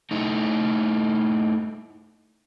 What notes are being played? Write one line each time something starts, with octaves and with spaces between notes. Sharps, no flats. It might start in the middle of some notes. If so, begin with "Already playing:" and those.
A3 D#4 E4